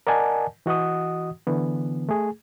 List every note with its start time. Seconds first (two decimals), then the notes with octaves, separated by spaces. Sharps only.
0.07 A#4 D5 D#5 F#5 G#5 A5
0.66 E3 F#4 D#5 F#5 D#6
1.47 D3 E3 B3
2.09 A3 G#4